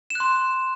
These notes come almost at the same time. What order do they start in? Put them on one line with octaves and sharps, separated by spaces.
E7 F#6 C6